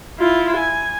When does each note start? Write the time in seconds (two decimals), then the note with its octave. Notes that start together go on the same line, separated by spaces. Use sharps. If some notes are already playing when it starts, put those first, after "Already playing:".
0.18 E4 F4
0.57 G#5